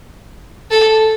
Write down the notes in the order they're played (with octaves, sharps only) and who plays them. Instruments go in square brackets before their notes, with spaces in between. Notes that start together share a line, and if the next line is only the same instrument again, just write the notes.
[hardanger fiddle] A4